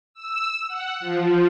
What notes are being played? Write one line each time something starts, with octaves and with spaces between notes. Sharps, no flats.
E6
F#5
F3